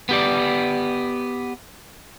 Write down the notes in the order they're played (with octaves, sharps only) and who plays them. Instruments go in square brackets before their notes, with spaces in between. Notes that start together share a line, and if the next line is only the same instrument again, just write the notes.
[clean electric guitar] B3 G4 D5